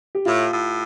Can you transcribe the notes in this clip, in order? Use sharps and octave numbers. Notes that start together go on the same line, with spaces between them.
G4
A2 F4
A2